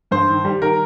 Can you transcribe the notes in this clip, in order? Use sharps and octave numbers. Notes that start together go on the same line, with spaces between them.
G2 C5
D#3
G3
D#3 A#4